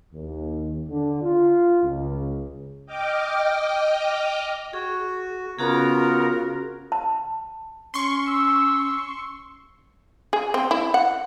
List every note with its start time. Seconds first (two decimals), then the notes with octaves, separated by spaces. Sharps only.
0.13 D#2
0.89 D3
1.22 F4
1.83 C#2
2.86 D#5 G5 D6 F6
4.73 F#4 G#4
5.59 C#3 B3 C#4 F4 F#4 G#4 A#4
6.92 A5
7.94 C#4 C6 C#6
8.27 E6
10.33 G#4
10.54 C4
10.71 E4
10.94 F#5